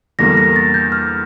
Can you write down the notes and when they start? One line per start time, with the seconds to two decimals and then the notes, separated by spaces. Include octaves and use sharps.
0.19 E2 D3 G3 A#3 A#6
0.37 A#6
0.56 A6
0.74 G6
0.92 F6